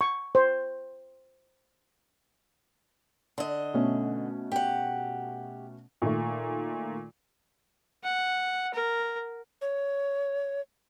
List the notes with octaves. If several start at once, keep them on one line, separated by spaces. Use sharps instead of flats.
C#6
C5
D3 D#5
B2 A3 C#4
G4 F#5
A#2 D#3 A3
F#5
A#4
C#5